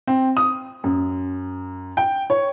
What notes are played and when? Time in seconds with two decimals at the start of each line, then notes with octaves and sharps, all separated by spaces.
0.07 C4
0.37 D#6
0.84 F#2
1.97 G5
2.30 C#5